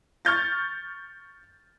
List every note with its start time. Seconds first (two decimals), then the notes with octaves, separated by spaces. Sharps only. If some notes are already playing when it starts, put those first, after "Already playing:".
0.25 C#6 F6 G6 A6